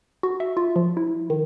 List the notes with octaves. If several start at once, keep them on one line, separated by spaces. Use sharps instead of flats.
F#4
E5
F4
F3
E4
D#3